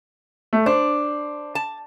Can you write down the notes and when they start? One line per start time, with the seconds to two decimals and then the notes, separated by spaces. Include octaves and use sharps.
0.53 A3
0.66 D4 C5
1.55 A5